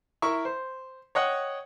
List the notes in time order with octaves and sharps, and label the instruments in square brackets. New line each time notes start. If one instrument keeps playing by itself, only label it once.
[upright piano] E4 A#4 E5 C#6
C5
C#5 D#5 F#5 G5